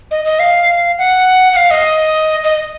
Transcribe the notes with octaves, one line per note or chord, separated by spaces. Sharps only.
D#5
D#5
F5
F#5
F#5
F5
D#5
D#5